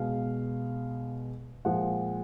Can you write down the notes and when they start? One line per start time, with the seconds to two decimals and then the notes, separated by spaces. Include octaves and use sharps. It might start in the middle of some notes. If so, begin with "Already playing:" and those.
Already playing: B2 G#3 F5
1.65 A#2 F3 G#3 F#5